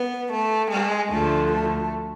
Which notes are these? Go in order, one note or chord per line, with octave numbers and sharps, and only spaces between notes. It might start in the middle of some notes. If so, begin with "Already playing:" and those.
Already playing: B3
A3
G#3
D2 D3 F3 A3
A3